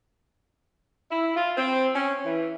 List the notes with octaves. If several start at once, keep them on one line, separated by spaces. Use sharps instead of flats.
E4
F4
C4
C#4
E3